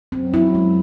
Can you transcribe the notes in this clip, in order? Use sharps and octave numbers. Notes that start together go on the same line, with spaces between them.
F#2 F#3 C4
E4
G#3